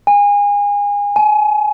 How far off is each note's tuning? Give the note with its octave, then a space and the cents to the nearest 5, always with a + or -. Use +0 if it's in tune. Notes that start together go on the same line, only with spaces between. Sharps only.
G#5 -30
G#5 +35